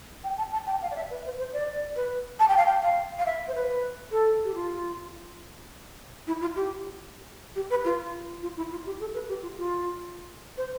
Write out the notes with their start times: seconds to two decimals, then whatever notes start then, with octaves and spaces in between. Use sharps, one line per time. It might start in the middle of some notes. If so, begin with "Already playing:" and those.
0.24 G5
0.38 A5
0.53 A5
0.67 G5
0.82 F5
0.91 D5
0.96 E5
1.10 B4
1.25 C5
1.38 C5
1.53 D5
1.96 B4
2.40 A5
2.48 G5
2.57 F5
2.66 G5
2.83 F5
3.19 F5
3.26 E5
3.48 C5
3.55 B4
4.12 A4
4.44 G4
4.54 F4
6.27 E4
6.41 F4
6.56 G4
7.56 G4
7.70 B4
7.85 F4
8.43 F4
8.57 E4
8.71 F4
8.86 G4
9.00 A4
9.14 B4
9.29 G4
9.42 F4
9.57 F4
10.57 C5